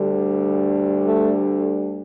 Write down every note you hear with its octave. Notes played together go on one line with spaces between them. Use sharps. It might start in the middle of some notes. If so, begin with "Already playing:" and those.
Already playing: D2 D3 G3
A3